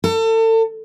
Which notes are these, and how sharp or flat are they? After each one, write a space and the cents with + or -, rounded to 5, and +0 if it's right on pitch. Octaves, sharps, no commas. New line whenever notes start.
A4 +35